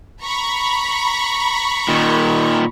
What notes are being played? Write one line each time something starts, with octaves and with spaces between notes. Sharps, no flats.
A#5 B5 C#6
A#2 D#3